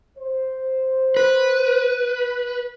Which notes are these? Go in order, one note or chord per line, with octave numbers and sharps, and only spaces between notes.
C5
B4